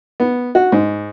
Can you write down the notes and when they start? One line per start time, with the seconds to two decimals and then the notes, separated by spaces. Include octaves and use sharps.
0.20 B3
0.55 F#4
0.72 G#2